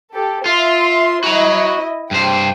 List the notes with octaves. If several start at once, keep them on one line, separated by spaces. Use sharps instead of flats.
G4 A4
F4 E5 C6
E4 F#4 D#5 A#5
G2 C5 G5